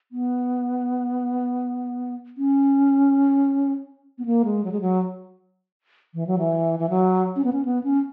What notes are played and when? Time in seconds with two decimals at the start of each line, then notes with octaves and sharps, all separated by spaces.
0.12 B3
2.38 C#4
4.18 B3
4.25 A#3
4.45 G#3
4.64 F#3
4.72 G#3
4.81 F#3
6.14 E3
6.27 F#3
6.39 E3
6.79 E3
6.90 F#3
7.36 C#4
7.44 B3
7.53 C#4
7.65 B3
7.84 C#4